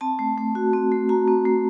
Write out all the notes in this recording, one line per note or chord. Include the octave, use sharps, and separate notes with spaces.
C4 A5
A3
A3
F#4
C4
A3
F#4 A#5
C4
A3